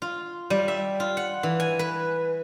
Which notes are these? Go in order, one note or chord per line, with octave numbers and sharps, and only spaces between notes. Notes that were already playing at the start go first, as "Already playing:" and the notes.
F4
G3
E5
F4
F#5
E3
G#5
B4